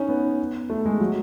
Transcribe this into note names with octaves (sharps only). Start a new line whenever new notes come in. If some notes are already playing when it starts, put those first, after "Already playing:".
Already playing: C#4 D#4
B3
A3
G#3
F#3